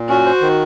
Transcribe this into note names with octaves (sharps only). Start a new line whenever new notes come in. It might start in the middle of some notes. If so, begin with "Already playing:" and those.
Already playing: A#2
C#4 F#4
C5
D#3